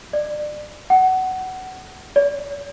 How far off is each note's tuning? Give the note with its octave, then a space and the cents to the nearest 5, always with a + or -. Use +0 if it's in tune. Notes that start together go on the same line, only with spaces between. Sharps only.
D5 +30
F#5 +20
D5 -45